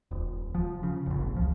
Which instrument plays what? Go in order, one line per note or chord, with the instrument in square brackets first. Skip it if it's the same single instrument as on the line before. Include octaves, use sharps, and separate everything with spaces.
[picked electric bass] D#1
F3
C#3
F1 A#1
C#2 F3